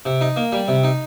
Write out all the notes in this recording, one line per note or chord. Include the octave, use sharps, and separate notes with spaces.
C3
D#4
A#3
G3
C3
D#4